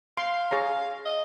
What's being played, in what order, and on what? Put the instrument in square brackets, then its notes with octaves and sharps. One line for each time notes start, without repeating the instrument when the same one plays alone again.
[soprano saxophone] F5 [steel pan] C6
[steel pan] G#4 C#5 A#5
[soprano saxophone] D#5